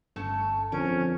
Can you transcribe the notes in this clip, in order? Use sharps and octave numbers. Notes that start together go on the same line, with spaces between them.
G1 A3 C#4 A4
F2 D3 C#4 A#4